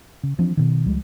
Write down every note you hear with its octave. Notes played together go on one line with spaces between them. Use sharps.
C#3
E3 F3 C4 D4
B2 D#3
C#2 F3 G3 G#3